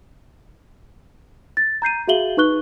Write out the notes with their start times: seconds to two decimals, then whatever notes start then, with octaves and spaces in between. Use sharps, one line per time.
1.57 A6
1.82 A#5 G6 C7 D#7
2.07 F#4 G#4 E5 F5 F#7 G7
2.37 D#4 B4 C#6 F#6 G7